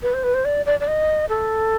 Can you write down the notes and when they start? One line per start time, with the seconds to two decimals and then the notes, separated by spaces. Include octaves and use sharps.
0.02 B4
0.14 C5
0.23 B4
0.34 C5
0.45 D5
0.66 D5
0.80 D5
0.87 D#5
1.29 A4